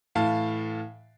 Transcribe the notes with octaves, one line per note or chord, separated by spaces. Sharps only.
A2 E3 F5 A5